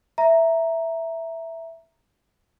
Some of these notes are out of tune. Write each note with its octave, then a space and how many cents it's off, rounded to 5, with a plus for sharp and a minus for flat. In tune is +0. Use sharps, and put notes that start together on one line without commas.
E5 +0 A#5 +0